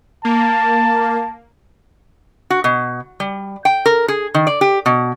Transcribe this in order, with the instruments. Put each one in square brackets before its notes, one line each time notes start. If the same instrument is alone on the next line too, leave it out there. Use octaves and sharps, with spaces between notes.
[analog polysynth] A#3 [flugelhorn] A5
[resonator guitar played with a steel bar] F#4
B2
G3
G5
A#4
G#4
D#3
D5
G4
B2